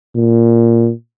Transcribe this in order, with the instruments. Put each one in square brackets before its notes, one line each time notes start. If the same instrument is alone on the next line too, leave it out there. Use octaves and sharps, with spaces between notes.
[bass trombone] A#2